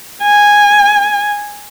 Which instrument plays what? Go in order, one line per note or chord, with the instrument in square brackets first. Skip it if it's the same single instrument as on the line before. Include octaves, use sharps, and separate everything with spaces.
[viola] G#5